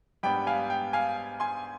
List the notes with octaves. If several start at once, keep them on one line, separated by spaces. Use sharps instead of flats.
G#2 G3 B3 D4 G5 B5
F5 G#5
G5
F5 G#5
G#5 C6